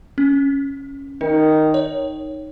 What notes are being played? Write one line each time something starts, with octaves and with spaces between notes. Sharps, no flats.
C#4
D#3 D#4
C#5